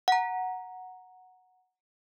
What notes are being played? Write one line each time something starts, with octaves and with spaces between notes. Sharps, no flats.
F#5 A#5